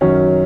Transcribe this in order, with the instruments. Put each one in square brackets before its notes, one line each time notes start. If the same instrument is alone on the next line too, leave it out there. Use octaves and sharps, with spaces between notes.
[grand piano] F#2 D#3 F#3 C#4